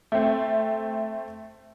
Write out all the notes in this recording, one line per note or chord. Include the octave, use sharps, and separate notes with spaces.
A3 C4